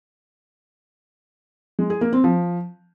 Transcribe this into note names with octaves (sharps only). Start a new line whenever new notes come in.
G#3
G#4
A#3
C4
F3